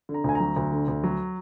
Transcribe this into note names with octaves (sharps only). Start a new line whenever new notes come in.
D3
A#5
D2 G#5
F#3 A#5
D2
D3
D2
F#3